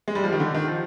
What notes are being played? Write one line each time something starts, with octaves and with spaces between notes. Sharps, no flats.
G#3
G3
F3
D#3
D3
D#3
F3